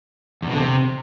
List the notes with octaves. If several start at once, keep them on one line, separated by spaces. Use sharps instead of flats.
E2
B2
D3
C3